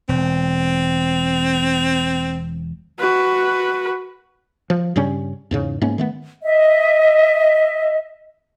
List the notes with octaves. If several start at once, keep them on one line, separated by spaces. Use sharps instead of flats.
E1 C4
F#4 B4
F3
G2 C#3 G3 C#4
E2 G#2 C#3
G#2 A#3 B3 C#4
D#3 A3 B3
D#5 E5